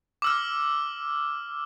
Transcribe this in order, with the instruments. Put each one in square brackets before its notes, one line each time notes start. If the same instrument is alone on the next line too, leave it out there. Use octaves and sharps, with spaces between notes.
[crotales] D6 E6 F6